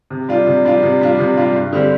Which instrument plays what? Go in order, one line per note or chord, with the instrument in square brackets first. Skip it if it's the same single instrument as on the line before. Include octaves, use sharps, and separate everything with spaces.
[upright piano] C3
G3 D4 F4
C3
G3 D4 F4
C3
G3 D4 F4
C3
G3 D4 F4
G2
D3 G3 C4 G4